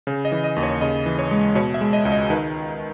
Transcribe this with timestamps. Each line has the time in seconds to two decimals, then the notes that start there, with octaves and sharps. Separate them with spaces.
0.07 C#3
0.25 D#5
0.32 E3
0.44 D#5
0.56 D#2
0.63 C#5
0.81 C#3 D#5
1.06 E3
1.19 C#5
1.31 G#3
1.55 B2 C#5
1.74 E5
1.81 G#3
1.93 D#5
2.05 C#2
2.12 D#5
2.30 D#3 B4